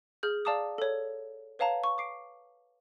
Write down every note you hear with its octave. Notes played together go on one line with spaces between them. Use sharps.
G#4 F6 G6
D5 F5 A5 A#5 D6 D#6
A4 C#5
B4 C#5 F5 A5 A#5
C#6
D6 C7 D7